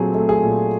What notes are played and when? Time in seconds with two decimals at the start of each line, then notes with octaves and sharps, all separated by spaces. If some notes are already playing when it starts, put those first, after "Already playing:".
Already playing: A#2 F#3 A3 C4 G#4
0.14 A3
0.29 G#4
0.43 A#2